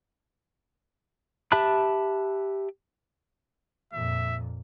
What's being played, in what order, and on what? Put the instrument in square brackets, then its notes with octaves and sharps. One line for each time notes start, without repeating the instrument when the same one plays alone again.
[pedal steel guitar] G4 E5 A5 B5 F#6
[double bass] F2 A#2 [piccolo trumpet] E5